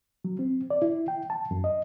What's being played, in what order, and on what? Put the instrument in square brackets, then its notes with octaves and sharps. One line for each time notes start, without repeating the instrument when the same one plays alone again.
[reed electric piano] F#3
C4
D5
E4
G5
A5
F#2
D#5